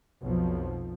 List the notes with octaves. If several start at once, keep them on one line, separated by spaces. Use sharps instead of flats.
B1 F2 B2 F3